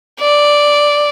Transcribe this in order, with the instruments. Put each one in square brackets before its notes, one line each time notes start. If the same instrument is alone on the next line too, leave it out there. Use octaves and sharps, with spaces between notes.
[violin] D5